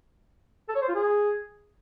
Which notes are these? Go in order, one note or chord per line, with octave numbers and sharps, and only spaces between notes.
A4
C#5
C5
F4
G#4